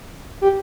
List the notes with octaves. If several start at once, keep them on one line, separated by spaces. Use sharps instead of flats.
G4